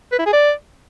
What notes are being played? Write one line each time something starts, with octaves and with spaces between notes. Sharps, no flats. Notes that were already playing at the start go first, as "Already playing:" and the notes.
B4
E4
G#4
D5